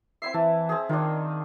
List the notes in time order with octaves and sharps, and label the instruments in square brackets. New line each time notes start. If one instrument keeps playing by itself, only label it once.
[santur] C4 E4 E5 [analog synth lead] C7
[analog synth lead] E3 [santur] A5
[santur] C4 G#4
[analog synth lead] D#3 [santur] D4 F4